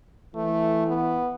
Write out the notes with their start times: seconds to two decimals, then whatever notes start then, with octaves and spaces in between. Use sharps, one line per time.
0.35 E3 A3
0.87 B3